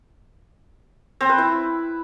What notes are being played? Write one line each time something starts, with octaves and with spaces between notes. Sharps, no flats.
C4
B4
E4